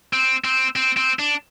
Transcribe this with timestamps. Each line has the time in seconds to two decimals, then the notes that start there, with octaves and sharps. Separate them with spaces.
0.13 C4
0.44 C4
0.76 C4
0.97 C4
1.19 D4